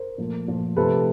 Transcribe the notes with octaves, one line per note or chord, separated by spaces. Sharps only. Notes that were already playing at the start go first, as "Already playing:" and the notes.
Already playing: A#4 C5
A#2 F3 A3
A#2 F3 A3
C3 F3 A3 A4 B4